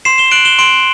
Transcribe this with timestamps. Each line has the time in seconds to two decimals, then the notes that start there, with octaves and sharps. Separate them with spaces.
0.05 C6 C7 E7
0.18 E7 G7
0.31 F#6 D7 F#7
0.45 E7 G7
0.59 C6 D7 F#7